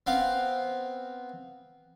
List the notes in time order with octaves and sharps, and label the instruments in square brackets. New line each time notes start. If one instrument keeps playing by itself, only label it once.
[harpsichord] B3 C4 F5